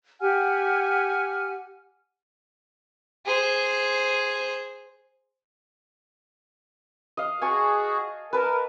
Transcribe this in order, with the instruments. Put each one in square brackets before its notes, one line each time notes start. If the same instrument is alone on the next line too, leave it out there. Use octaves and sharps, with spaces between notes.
[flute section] G4 F#5 G#5 F6
[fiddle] G#4 C5
[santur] D#5 F5
[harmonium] F#4 G#4 [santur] G#5 A5 C#6
[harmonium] A#4 [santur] B4 A5